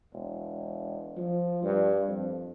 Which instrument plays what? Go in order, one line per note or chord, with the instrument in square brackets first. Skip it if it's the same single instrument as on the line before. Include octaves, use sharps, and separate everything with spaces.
[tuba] E1
F3
G2
F2